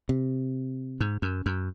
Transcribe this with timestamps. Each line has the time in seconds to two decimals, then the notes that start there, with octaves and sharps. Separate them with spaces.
0.09 C3
1.01 G#2
1.22 F#2
1.46 F#2